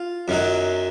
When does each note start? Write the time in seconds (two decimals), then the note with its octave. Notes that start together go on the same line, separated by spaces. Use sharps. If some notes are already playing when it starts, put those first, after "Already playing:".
Already playing: F4
0.28 F#2 D#3 F#3